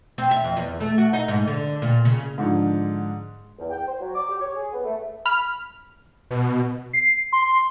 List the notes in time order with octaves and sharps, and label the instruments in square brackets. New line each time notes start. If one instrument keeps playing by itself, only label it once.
[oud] C4
E5
F2
E2
A3
F#4
D#4
G#2
D3
A#2
C#3
[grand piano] G#2 D3 F3
[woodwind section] E2
G5
C5
F#3
D6
G4
C#5
G#4
B3
A3
[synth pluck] B5 F6
[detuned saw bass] B2
[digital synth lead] C7
C6